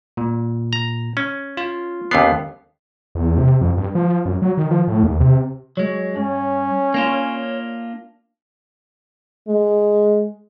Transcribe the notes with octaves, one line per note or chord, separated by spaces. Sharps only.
A#2
A#5
C#4
F4
D#2 D3 B3 C#4 C7
E2
C3
F2
G2
F3
F#2
F#3
D#3
F3
A2
D#2
C3
F#3 G#3 C#5
G2 C#4
A#3 D4 F4
G#3